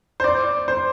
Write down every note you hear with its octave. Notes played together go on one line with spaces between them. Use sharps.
C5
D5
C5